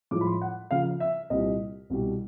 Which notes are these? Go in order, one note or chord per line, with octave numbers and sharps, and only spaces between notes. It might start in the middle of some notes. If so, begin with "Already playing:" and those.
A2 F3 G#3 D6
B5
C6
F#5
C#3 F3 A#3 C#4 F5
E5
C2 A#2 G3 C4 D#5
C2 B2 G3